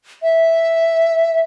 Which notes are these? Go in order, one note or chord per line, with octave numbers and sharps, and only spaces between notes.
E5